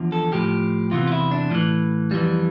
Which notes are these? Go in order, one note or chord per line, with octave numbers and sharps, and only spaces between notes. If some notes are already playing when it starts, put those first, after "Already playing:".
Already playing: E2 D3 F3
A4
A2 F3 G4
E2 C3 E3 F4
F4
E4
D4
A2 E3 F3
F2 E3 G3